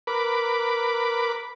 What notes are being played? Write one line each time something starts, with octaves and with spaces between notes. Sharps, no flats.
A#4 B4 B5 D6